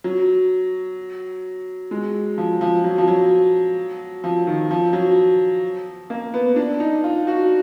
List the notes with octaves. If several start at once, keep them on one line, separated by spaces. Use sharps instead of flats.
F#3
G#3
F3
F3
F#3
F3
F#3
F3
D#3
F3
F#3
A#3
B3
D4
D#4
F4
F#4